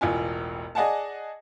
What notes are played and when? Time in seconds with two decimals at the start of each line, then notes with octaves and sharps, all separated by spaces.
0.01 E1 A1 F4 G#5
0.75 G#4 D5 D#5 F#5 G#5 A5